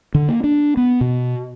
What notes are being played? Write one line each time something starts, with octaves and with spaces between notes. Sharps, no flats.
D3
A#3
D4
B3
B2